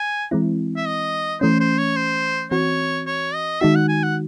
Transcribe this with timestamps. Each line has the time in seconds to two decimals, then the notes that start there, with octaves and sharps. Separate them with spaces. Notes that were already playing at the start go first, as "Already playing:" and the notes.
Already playing: G#5
0.31 E3 G#3 C4 E4
0.76 E5
0.86 D#5
1.41 E3 A3 C#4 C5
1.60 C5
1.78 C#5
1.96 C5
2.51 E3 C4 F#4 C#5
3.07 C#5
3.34 D#5
3.61 D#3 G#3 D#4 F#4 E5
3.75 F#5
3.88 G#5
4.03 F#5